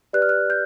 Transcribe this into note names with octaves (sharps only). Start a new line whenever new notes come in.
G4 B4 D5 F#6
F6
F#6
G6